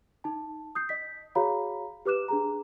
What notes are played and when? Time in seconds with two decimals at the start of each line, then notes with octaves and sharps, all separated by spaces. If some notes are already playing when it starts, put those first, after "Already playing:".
0.24 D#4 A5
0.75 D#6 G6 C7
0.89 D#5 B6
1.35 F#4 G#4 C#5 F5 A#5 B5
2.05 G4 B4 D6 F#6 E7
2.28 D4 G#4 A#5